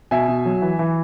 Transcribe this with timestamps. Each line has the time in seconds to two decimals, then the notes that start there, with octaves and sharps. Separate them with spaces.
0.11 B2 E5 G#5
0.28 B2
0.45 F#3
0.62 E3
0.79 E3